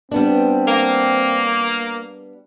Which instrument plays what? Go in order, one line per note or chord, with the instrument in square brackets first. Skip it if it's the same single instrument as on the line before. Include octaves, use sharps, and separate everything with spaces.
[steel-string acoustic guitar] G3 B3 D4 [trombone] C4
[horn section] A#3